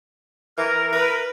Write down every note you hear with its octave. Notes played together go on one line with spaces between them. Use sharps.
E3 A#4
B4